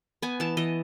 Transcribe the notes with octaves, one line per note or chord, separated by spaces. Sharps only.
B3 G#5
E3 A5
E3 D#5